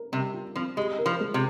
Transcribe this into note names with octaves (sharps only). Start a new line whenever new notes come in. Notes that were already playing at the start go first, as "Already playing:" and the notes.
Already playing: A#4
C3 G3
F4
F3 C4
G#3 G4
A#4
F3
G#3
C3